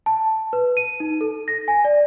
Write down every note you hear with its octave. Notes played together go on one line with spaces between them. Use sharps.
A5
B4
D#7
D#4
A4
A#6
G#5
D5